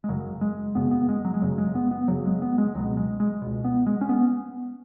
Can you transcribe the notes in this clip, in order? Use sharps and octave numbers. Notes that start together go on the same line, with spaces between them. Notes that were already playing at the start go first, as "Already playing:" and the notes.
G#3
F#1 F#2 C#3 F#3
G#3
F#1 F#2 C#3 B3
B3
G#3
F#3
G#3
F#1 F#2 C#3 F#3
G#3
B3
B3
F#1 F#2 C#3 F#3
G#3
B3
G#3
C#2 B2 F#3
G#3
G#3
C#2 B2
B3
G#3
C#4
B3